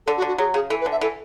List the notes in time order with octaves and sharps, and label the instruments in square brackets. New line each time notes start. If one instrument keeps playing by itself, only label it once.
[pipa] D3 [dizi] A4
[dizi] F#4
[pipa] D3
[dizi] F#4
[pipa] F#3 [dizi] G#4
[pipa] C#3 [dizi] G#4
[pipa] E3 [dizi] A4
[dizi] B4
[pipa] D3
[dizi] E5
[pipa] E3 [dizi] A4